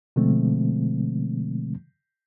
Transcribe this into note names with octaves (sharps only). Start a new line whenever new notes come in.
B2 D3 F3 G#3 A3 C4